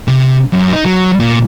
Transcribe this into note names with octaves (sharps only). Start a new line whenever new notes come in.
C3
F#2
D#4
F#3
A#2